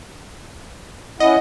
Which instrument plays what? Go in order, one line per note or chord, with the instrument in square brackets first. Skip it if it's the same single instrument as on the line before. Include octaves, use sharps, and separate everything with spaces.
[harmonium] C#4 E4 F#5 [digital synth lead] D#5